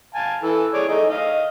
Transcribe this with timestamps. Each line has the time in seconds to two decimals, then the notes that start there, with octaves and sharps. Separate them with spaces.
0.15 F5 G#5 A5
0.43 E3 A4
0.74 G#4 C#5 D5
0.89 A3 D#4
1.10 D#5 F5